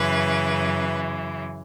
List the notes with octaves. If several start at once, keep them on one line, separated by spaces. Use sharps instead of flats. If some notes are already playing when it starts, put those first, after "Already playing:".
Already playing: F#2 C#3 E3 B4